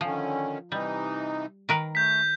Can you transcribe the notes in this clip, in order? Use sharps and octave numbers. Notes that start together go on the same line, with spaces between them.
D3 D#3 F3 C#4
C3 E3 G3 D#4
D#3 A#4 B4
A3 G6 B6